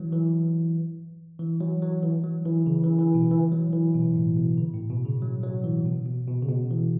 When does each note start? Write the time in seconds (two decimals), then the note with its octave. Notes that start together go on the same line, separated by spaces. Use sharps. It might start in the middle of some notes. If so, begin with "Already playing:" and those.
Already playing: E3 F#3
0.13 E3
1.39 E3
1.61 F#3
1.82 F#3
2.03 E3
2.24 F#3
2.45 E3
2.66 C#3
2.84 E3
2.99 E3
3.14 B2
3.31 E3
3.52 F#3
3.73 E3
3.94 B2
4.16 A2
4.37 B2
4.58 C#3
4.74 A2
4.90 B2
5.05 C#3
5.22 F#3
5.43 F#3
5.64 E3
5.86 B2
6.06 B2
6.28 B2
6.42 C#3
6.49 B2
6.71 E3